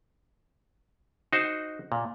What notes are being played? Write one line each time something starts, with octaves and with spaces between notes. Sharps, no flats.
D#4 F#4 C5
A#2